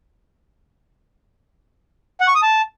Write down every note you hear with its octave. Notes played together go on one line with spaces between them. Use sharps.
F#5
C#6
D#6
A5